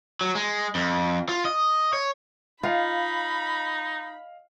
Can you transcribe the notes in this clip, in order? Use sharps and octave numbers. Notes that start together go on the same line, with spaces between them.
F#3
G#3
F2
F4
D#5
C#5
D#4 F4 D#5 F5 B5